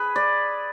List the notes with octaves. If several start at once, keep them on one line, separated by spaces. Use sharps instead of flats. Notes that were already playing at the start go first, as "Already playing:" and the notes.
Already playing: G#4 B4
D5